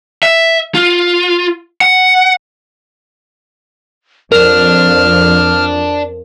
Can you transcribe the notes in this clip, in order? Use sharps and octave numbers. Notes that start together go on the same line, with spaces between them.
E5
F4
F#5
F2 F3 D4 A#4 F6